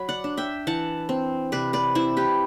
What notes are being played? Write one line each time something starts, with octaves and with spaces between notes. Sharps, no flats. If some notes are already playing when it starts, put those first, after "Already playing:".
Already playing: F#3 B5
D5 F#5
D4
E5 G5
E3 F#5 A5
C4
C3 B4 D5
B4 D5
C4 E4
G4 B4